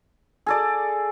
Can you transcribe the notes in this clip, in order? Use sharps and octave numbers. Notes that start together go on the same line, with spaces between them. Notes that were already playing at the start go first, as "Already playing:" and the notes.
G#4 A4 D5